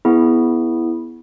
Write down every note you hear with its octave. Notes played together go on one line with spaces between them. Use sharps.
B3 E4 G#4